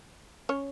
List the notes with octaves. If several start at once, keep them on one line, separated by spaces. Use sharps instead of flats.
C#4 C#5